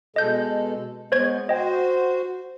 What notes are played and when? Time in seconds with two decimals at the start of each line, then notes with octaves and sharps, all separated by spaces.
0.16 B2 G#3 A4 D#5 G6
1.12 G#3 B3 C5 C#5 G#6
1.49 F#4 C5 D#5 G5